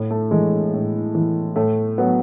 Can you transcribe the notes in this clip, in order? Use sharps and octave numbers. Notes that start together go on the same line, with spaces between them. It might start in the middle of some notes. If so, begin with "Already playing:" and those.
Already playing: A2
A3
E3 G#3
A2
E3
A2 A3
F#3 B3